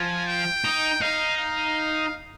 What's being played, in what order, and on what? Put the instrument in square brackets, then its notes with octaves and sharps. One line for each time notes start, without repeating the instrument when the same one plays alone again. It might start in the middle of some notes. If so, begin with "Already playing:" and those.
Already playing: [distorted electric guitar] F3 [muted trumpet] G#5
[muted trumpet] G5
[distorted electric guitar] D#4
[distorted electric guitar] D#4 [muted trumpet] F5
[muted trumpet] F5